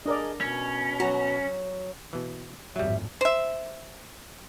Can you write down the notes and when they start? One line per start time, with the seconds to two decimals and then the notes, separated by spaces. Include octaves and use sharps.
0.06 D4 G#4 A#4 D5 D#5
0.41 B2 C#4
1.00 F#3 F#4 A#5
2.13 B2 E3
2.76 G#1 F2 A2 F#3 G3 E5
3.21 C5 E5